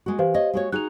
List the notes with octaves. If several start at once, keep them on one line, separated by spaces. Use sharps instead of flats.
G#3 F#4
E3 G4 C5 F5
C#5 D#5
G#3 F#4 C#5
D#4 F#4 G#4 F#6 F7